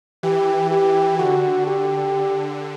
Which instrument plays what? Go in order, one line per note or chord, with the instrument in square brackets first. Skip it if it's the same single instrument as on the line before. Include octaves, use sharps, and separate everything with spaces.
[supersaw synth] E3 [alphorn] G4
[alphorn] G4
[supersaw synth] D3 [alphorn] F#4
[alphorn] G4